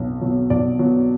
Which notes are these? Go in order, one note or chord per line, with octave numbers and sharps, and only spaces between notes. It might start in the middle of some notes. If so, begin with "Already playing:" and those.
Already playing: B1 B2 F#3
B2 F#3
B1 D5
B2 F#3